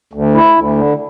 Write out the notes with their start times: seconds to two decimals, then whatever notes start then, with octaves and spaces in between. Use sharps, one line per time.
0.13 D2
0.34 E4
0.56 D2
0.77 D3